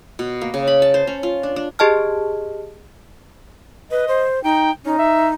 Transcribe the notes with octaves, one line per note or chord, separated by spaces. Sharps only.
B2
A#3
C#3
B5
A5
C5
C#4
F4
D4
D4
G4 G#4 D#5 A5 F6
B4 D#5
C5
D#4 G5
C#4 D#4
E5